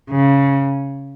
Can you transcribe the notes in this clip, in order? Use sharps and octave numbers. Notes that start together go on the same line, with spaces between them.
C#3